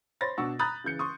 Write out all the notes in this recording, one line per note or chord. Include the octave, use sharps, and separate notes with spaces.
C5 C#5 B5 C6 A6 A#6
B2 D4 F#5 C#6 E6
A#5 B5 D#6 F#6 G6 A6
C#3 E3 G6 C#7
C6 C#6 D#6